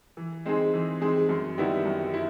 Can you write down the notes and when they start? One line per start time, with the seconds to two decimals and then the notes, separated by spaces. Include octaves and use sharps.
0.17 E3
0.45 G#3 C4 D#4 G#4
0.74 E3
1.01 G#3 C4 D#4 G#4
1.29 F#2
1.58 D#3 G3 B3 E4
1.86 F#2
2.14 E4